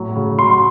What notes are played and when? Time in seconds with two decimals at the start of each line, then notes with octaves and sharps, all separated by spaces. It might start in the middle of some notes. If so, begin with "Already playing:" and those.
Already playing: A2 F#3
0.16 C#3
0.39 F#3 C6